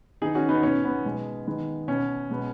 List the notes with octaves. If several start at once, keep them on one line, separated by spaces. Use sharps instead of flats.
D#3 B3 D#4 G#4
C#4 F#4
B3 D#4
B2 B3 C#4
B3
B2 G#3 B3
D#3 G#3 B3
B2 B3 C#4
B2 G#3 B3